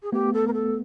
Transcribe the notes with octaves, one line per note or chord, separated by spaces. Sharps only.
G#4
A3 B3 G4
A4
A#4
A4